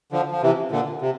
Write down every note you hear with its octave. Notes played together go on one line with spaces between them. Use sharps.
D3 F3
F3
C3 E3
A#2 D3
C3